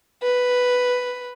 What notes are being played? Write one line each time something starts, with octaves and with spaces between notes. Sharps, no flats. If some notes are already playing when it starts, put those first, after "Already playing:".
B4